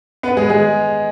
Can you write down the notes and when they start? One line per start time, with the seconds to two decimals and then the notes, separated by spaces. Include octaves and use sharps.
0.23 B3 B4
0.37 G#3 G#4
0.50 G#3 G#4